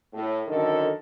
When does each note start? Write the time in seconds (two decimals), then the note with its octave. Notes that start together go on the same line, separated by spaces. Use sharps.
0.13 A2
0.47 F#2 D3 D#3 A4